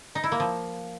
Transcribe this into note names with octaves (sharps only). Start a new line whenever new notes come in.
D#4
E4
A#3
F3